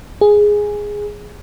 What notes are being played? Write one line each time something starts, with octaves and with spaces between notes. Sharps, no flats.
G#4